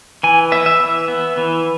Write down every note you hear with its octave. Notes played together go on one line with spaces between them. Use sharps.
E3 G#5
B3 E5
E5
E3
B3
E3